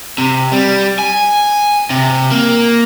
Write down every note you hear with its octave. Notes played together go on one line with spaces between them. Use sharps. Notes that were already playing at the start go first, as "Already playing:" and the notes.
C3
G3
G#5
C3
A#3